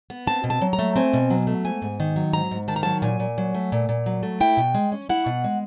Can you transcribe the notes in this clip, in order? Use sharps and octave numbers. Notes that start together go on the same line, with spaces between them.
B3
C4 A5
B2
A5
F#3
A#5
A3
C4 G#5
B2
F#3
A3
G#2 G#5
G#2
D#3
F#3
G#2 A#5
G#2
D#3 A5
A#5
F#3 A5
A#2 G#5
A#2
F#3
A3
A#2
A#2
F#3
A3
E4 G5
B2
G#3
C#4
E4 F#5
B2
G#3